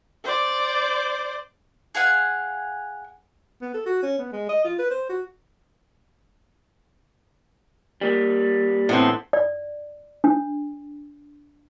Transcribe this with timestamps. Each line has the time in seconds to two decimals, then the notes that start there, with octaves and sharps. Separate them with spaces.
0.24 C5 D5
1.95 G#4 F5 F#5 G#5
3.62 B3
3.74 A4
3.86 F#4
4.03 C#4
4.19 B3
4.32 G#3
4.49 D#5
4.64 F4
4.79 B4
4.91 C5
5.09 F#4
8.01 G3 A#3
8.89 E2 A2 D3 B3 C4 C5
9.33 D5
10.24 D4